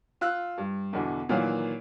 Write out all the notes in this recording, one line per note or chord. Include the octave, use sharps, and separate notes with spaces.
F4 E6 F#6
G2
E2 B2 D3
A#2 D#3 E3 F#3 F5